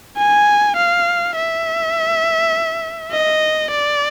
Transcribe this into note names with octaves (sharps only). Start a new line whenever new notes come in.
G#5
F5
E5
D#5
D5